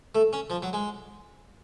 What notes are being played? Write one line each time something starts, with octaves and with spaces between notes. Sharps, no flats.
A3
C#4
F3
F#3
G#3